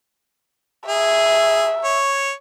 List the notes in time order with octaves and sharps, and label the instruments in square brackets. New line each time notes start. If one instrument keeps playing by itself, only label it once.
[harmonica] G#4 [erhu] E5
[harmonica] C#5